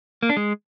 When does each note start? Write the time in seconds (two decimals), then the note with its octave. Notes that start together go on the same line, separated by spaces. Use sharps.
0.23 A#3
0.30 D4
0.37 G#3